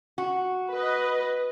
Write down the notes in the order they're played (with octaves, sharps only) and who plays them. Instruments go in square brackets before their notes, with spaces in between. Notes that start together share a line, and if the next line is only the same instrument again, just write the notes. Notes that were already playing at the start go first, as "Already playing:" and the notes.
[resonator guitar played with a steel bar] F#4
[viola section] B4 D#5